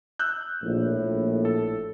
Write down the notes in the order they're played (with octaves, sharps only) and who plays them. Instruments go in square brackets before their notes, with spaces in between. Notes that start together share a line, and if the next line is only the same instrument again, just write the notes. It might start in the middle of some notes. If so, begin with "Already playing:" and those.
[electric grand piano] E6 F#6 G6
[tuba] A#1 [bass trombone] A2
[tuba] A#1
[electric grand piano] A4